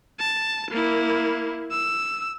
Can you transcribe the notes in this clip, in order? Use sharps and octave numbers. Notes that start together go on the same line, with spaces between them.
A5
A#3 E4
E6